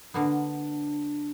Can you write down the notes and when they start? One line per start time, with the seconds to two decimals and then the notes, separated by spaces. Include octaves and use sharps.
0.14 D3 A#3 B3 D4